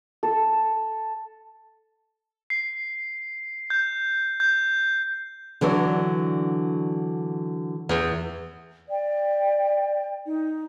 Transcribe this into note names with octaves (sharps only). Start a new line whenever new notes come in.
A4
C7
G6
G6
D3 E3 F#3 D4
E2
D5 G5
D#4